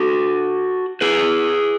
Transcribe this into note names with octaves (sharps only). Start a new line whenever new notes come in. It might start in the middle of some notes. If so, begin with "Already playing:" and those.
Already playing: F#4 A4
G#4 B4